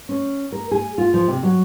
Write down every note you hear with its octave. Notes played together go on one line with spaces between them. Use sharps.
C#4
A#4
G#4
F4
F3
C3
F#3